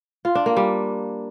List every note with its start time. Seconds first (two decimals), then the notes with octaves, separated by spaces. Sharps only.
0.25 F4
0.35 D4
0.46 A#3
0.57 G3